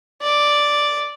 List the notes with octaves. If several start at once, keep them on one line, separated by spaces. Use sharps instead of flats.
D5